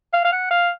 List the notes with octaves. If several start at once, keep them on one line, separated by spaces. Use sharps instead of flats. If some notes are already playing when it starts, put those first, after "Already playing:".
F5
F5
F#5
F5